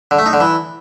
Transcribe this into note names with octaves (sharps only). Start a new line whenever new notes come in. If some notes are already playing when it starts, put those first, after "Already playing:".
D3
A3
D#4
D3
E3